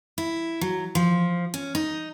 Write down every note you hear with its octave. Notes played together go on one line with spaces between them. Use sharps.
E4
F#3
F3
C#4
D#4